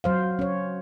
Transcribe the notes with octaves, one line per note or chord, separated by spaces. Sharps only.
F#3 C5 F5
C#4 C#5